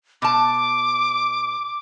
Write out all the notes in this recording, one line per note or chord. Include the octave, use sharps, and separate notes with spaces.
B2 A5 D6